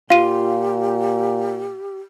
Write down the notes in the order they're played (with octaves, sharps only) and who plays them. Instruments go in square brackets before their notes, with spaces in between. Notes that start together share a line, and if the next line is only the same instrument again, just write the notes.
[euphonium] A#2 [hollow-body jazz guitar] F4 [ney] G4 [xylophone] F5 D#7